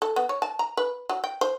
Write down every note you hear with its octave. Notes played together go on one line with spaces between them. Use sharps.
A4
B3
C#5
A5
A#5
B4
F#3
G5
C5